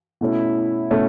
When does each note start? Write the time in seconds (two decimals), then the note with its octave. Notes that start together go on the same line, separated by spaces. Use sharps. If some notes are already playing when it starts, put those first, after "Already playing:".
0.21 B2 A3 C#4 E4
0.91 B2 A3 C#4